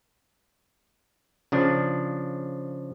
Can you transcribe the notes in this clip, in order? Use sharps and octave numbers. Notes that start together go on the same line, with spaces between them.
C#3 F3 D4